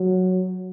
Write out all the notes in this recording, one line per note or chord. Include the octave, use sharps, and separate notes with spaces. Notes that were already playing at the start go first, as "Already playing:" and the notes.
Already playing: F#3